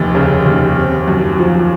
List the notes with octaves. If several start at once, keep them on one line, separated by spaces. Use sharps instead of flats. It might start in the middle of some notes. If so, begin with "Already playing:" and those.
Already playing: F1 D#2
C#3
D#2
C4
F#2
F3